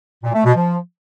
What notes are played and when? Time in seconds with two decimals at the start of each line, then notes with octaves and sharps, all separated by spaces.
0.23 A#2
0.33 A3
0.44 B2
0.55 F3